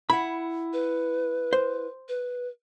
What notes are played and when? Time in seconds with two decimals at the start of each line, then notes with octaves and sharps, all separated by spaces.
0.10 E4 F#5 B5
0.73 B4
1.53 C5
2.09 B4